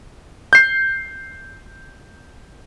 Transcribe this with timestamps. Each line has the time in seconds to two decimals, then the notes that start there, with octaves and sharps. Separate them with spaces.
0.53 G6 C7